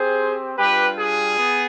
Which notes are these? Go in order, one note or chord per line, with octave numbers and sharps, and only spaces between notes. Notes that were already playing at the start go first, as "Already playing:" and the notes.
Already playing: C4 G4 G#4 C5
G3 D4 F4 G4 B4
G#4
B3